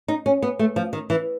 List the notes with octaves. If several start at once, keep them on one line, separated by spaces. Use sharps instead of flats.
D#4
C#4
B3
A3
F3
D#3
E3